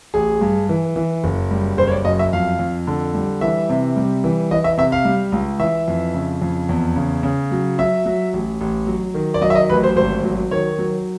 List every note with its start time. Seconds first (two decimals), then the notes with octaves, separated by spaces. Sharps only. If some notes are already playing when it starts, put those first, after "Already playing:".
0.14 A1 G#4
0.41 G2
0.69 E3
0.96 E3
1.24 F#1
1.51 G3
1.77 F#1 C5
1.87 C#5
1.92 D5
2.05 F#2 D#5
2.19 E5
2.33 F2 F5
2.59 F2
2.87 D3
3.15 G3
3.41 E3 E5
3.70 C3
3.96 G3
4.24 E3
4.51 E3 D#5
4.64 E5
4.77 C3 E5
4.92 F5
5.05 G3
5.32 C#2
5.59 E3 E5
5.88 F2
6.14 C#3
6.42 F2
6.69 E2
6.96 C#3
7.23 C#3
7.51 F#3
7.79 F#3 E5
8.06 F#3
8.33 A1
8.61 A1
8.87 F#3
9.14 D#3
9.34 D5
9.42 F#3 D#5
9.50 E5
9.55 D#5
9.69 A1 B4
9.83 C5
9.96 G#1 C5
10.23 F#3
10.51 D#3 C#5
10.78 F#3